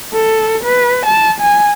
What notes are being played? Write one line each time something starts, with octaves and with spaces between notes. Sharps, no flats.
A4
B4
A5
G#5